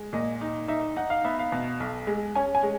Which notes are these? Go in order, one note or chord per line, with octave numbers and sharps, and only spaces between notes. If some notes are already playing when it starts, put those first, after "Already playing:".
Already playing: G#3
A#2 D#5
D#4
D#4 E5
D#4 F#5
F5
B3 E5
F5
B2
B1
G#3
C#4 G#5
G#5
G#3